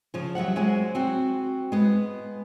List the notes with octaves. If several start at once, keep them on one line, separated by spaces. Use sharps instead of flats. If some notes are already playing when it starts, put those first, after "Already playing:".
C#3 F3
F#3 G3 E5 F#5
F#3 G#3 C5 G#5
C4 F#4
G#3 B3